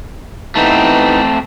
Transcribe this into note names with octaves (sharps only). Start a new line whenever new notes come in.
E3 A3 B3 C4 D#4